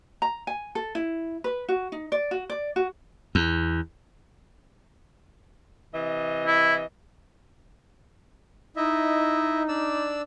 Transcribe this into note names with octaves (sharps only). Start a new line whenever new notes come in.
A#5
G#5
A4
E4
B4
F#4
D#4
D5
F#4
D5
F#4
E2
C3 E3 D#5
E4
D#4 E4 D#5 E5
D4 D5 E6